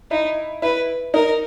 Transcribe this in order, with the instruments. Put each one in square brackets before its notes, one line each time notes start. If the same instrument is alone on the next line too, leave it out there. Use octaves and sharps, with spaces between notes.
[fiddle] D#4 [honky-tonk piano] E4
[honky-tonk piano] E4 [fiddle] B4
[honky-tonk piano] D#4 [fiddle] A#4